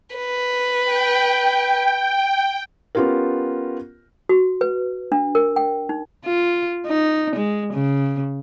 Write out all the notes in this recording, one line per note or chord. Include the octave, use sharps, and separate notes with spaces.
B4
G5
B3 C#4 F4 G4 A#4
F#4
B4
D4
A#4
G5
D#4
F4
D#4
G#3
C#3